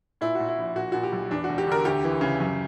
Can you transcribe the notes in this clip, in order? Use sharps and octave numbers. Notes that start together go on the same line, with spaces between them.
A#2 E4
A#2 F#4
E4
A#1
A#2 F#4
A#2 F#4
G4
B1
E2 D4
F#4
E1
G4
D3 A#4
D2 G4
E3
C#3
F#2